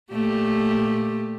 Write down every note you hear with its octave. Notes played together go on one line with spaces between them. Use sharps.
A#2 A3 G4